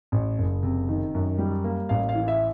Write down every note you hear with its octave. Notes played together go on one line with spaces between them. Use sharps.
A1
F#1
C3
D#3
F#2
G3
A#3
A1 F5
F5
E3
E5